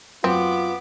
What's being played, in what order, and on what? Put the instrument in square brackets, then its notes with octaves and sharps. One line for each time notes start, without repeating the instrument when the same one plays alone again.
[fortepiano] F#2 [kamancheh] B3 D6 [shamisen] C4 [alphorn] F4